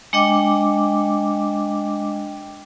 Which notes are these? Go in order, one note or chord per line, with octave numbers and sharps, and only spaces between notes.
G#3 D4 D#5 G5 D6